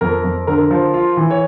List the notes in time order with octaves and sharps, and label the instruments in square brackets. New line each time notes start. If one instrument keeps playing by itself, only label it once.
[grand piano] F2 A#4
F2
D3 A#4
F3
F4
E3
C#5